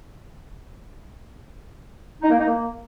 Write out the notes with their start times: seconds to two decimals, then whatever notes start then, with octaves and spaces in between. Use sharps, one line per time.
2.22 D#4
2.30 A#3
2.38 D#4
2.46 A#3